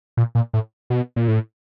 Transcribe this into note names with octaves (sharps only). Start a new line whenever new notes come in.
A#2
A#2
A2
B2
A#2
A2